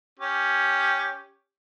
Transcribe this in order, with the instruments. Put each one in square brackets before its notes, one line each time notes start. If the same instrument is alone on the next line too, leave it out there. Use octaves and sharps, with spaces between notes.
[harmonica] C#4 G4